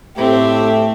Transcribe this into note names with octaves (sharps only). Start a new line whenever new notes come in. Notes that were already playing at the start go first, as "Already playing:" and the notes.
A2 A3 C4 G4 E5